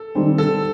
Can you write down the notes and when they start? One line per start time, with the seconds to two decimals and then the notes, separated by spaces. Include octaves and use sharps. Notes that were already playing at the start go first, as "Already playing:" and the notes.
Already playing: A4
0.15 D#3 G3 C4 D#4
0.38 D3 A4